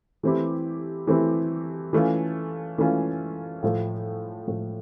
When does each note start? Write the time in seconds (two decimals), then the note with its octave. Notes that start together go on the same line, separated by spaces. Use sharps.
0.23 E3 A3 C4 E4 G4
1.07 E3 A3 C4 E4 G4
1.93 E3 A3 C#4 F4
2.78 E3 A3 C#4 F4
3.63 A2 F3 A3
4.48 A2 F3 A3